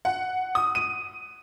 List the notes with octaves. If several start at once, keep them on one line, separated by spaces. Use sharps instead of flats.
F#5
D#6
D#7